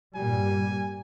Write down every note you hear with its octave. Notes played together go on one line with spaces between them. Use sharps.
G2 A#2 G3 G#5